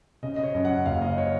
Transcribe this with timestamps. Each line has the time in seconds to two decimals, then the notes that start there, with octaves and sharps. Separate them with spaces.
0.23 C#3 D#5
0.36 D#5
0.43 C#5
0.55 F#2
0.65 F#5
0.86 F#1 F5
1.02 D#5
1.18 C#5